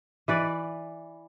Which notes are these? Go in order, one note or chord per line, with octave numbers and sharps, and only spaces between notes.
E3 B4 D5